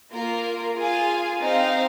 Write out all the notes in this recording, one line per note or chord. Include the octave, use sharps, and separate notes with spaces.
A#3 F4 A#4
F4 G#4 F5 G#5
C4 D#4 C5 F5